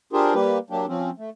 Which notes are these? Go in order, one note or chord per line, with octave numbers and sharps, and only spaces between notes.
D4 F4 G4 G#4 A#4 C5
G3 A#3 G4 B4
F#3 A#3 D4 G4
F3 C4 C#4
A3